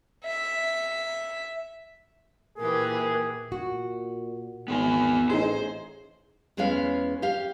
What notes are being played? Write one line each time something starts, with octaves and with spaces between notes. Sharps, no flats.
E5
A#2 E3 G4 G#4 A#4
A#2 F#4
G#1 B3 G#4 G#5
A1 D#4 G#4 C5
E2 G#3 B3 C#4 B4 F5
G4 F5